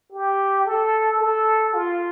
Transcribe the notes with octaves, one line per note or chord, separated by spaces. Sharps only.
G4
A4
A4
F4